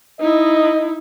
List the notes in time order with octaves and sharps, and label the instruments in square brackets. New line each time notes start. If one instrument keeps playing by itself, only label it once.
[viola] D#4 E4 [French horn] D#5